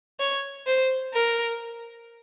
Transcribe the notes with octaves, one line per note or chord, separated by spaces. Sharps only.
C#5
C5
A#4